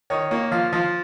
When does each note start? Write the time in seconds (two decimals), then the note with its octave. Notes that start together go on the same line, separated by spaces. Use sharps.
0.10 D#3 C#5
0.31 A#3 C#5
0.52 F3 F5
0.73 F3 F5